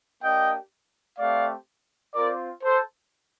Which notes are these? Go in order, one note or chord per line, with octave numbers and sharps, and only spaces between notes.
A#3 D4 G4 D#5 G5
A3 C4 G4 D5 F5
C4 F4 A#4 D5
A4 C5